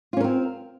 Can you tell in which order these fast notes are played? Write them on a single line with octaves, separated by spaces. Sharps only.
F4 C#4 A#4 C4